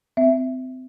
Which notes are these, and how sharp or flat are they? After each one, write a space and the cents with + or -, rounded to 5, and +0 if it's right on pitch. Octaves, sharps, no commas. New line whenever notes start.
C4 -30 E5 +0